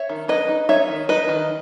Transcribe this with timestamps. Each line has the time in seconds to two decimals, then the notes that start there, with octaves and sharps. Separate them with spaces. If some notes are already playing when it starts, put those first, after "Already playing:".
Already playing: C#5 E5
0.09 D#3
0.28 D#4 B4 D#5
0.49 D#4
0.69 D#4 C#5 E5
0.88 D#3
1.09 D#4 B4 D#5
1.29 D#3